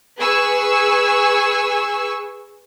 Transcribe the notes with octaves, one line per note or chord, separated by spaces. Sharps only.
G#4 B4 G#5 C#6 E6